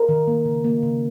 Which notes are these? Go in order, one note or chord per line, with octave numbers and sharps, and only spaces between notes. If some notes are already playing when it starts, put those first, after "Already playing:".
Already playing: A#4
D#3
A#3
C#3
A#3
C#3